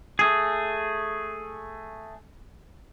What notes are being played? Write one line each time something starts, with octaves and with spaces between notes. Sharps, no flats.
A3 G#4